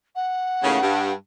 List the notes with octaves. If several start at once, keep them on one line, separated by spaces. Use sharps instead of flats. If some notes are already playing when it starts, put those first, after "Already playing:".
F#5
D#2 A2 C#3
G2